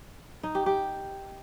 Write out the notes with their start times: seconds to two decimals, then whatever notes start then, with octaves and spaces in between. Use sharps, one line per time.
0.43 D#4
0.55 G4
0.66 G4